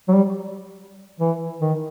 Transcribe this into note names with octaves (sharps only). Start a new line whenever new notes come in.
F#3
G3
E3
D#3